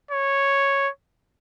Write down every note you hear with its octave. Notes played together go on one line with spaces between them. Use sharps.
C#5